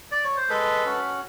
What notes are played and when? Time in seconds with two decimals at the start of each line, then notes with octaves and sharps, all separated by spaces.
0.11 D5
0.24 C#5
0.37 C5
0.49 G#3 A4 B4
0.85 C#4 F#4